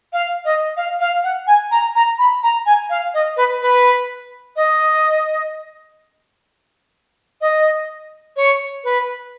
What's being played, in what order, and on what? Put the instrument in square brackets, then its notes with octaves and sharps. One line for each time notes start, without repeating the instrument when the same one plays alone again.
[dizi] F5
D#5
F5
F5
F#5
G#5
A#5
A#5
B5
A#5
G#5
F5
D#5
B4
B4
D#5
D#5
C#5
B4